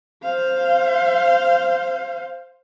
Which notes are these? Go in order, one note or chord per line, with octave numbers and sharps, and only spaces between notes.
C5 F5